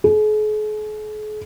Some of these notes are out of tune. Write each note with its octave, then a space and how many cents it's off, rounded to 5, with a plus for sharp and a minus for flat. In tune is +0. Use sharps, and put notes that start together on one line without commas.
G#4 +45